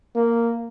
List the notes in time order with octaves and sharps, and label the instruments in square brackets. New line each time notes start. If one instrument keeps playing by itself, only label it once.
[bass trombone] A#3